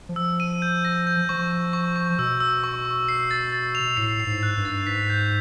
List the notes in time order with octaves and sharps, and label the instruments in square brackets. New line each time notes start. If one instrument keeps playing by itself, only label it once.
[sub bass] F3
[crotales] E6
D#7
G6
A#6
G6
[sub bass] F3 [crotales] C#6
[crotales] C#6
C#6
C#6
[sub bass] B2 [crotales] E6
[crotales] E6
C#6
C#6
C7
A6
A6
F7
[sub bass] A2 [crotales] C7
[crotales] C7
[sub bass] G#2
[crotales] F#6
[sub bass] G2
[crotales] A6
[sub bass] G#2 [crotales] B6
[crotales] G6